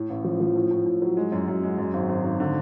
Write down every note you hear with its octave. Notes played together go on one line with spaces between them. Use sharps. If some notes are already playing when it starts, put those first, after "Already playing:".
Already playing: A2
A1
F3
F3
A2
A2
A2
F#3
G#3
F#2
F#2
G#3
F#2
G#1
G#1
G#1
D3